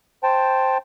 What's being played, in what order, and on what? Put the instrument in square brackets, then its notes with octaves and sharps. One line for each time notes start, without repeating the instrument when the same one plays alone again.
[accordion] C5 G5 A5